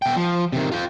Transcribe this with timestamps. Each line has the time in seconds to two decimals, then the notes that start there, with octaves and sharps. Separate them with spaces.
0.02 B2 G5
0.16 F3
0.52 C3 D#3
0.72 F4 G5